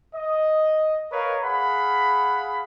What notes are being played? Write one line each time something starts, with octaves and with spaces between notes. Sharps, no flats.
D#5
A#4 B4 C#5 D#5 F5
G#4 F5 F#5 B5